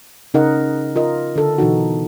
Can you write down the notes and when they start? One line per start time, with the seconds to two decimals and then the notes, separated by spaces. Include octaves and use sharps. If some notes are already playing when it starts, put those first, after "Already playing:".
0.34 C#3 D#4 A#4 D#5 F#5
0.96 F4 A#4 D#5
1.36 D3 A4
1.58 B2 E3 D#4 F#4